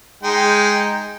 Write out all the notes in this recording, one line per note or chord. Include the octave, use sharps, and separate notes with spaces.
G#3 D#4 G5